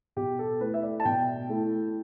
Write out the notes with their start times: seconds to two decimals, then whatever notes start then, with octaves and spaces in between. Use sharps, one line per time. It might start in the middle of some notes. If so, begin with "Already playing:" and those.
0.16 B2 G4
0.39 A4
0.60 A3 E4 B4
0.74 E5
0.83 D5
1.00 A5
1.05 B2 G5
1.49 A3 E4